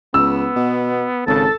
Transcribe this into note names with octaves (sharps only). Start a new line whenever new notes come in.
C#2 B3 E6
B2
G#1 C#3 A4 A5